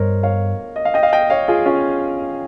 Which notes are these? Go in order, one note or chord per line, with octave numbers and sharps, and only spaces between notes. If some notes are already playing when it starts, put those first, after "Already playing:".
Already playing: G2 A#4 C5 C#5 D#5
C#5 F5
D#5
F5
D#5 G5
F5
D#5 G5
C#5 F5
F4 G#4
C#4 F4